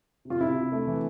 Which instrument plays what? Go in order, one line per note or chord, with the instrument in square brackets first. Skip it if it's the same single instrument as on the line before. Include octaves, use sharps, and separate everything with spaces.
[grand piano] C3
[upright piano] F4
[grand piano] C3 [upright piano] E4
[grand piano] C3
A3
E3